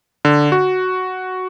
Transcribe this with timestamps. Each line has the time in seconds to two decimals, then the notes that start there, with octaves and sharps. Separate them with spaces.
0.25 D3
0.52 F#4